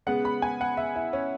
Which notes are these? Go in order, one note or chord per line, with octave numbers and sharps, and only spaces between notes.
C#3 G#3 B3 F#5
B5
G#5
F#5
E5
E4
C#4